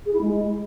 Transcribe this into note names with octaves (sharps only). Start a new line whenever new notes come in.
G#4
E4
G#3